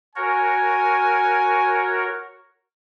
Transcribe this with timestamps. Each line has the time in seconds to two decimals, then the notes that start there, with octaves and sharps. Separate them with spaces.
0.16 F#4 A#4 C#5 G#5